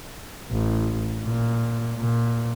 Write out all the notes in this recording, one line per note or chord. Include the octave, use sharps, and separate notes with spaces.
A1
A#2
A#2